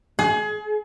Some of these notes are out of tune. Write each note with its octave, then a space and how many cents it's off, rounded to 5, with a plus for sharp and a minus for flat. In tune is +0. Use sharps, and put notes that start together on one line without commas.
G#4 +30